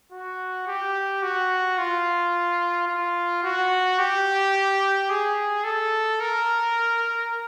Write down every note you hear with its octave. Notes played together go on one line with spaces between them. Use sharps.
F#4
G4
F#4
F4
F4
F#4
G4
G#4
A4
A#4